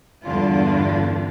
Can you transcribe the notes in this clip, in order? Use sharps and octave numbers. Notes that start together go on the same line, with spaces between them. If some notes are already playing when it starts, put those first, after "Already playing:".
E2 G2 D3 D4 F4